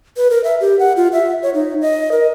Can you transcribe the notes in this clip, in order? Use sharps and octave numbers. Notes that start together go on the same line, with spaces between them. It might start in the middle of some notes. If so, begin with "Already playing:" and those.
B4
A#4
E5
G4
F#5
F4
E5
C#5
D#4
D#5
A#4